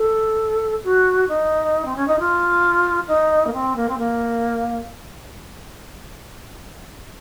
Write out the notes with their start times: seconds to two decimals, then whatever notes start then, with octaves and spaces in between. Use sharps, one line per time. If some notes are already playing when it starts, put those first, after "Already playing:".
Already playing: A4
0.84 F#4
1.28 D#4
1.85 C4
1.96 C#4
2.07 D#4
2.19 F4
3.08 D#4
3.47 A#3
3.53 C4
3.76 A#3
3.88 C4
3.98 A#3